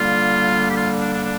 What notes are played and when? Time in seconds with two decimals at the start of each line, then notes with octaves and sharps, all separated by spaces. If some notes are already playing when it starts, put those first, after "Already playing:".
Already playing: D3 G3 A#3 F4
0.68 G4
0.75 F4
0.99 D4
1.11 D4
1.23 D4